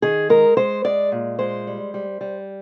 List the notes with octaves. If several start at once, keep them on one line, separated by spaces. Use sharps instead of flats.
D#3 G#4
G#3 A#4
G#3 C5
G#3 D5
A#2
G#3 C5
G3
G3
G3